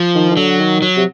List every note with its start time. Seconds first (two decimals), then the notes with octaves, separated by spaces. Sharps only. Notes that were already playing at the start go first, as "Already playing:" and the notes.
Already playing: F3
0.15 D#3
0.31 D#3
0.37 D3 F#3
0.60 D#3
0.82 F#3
0.97 C3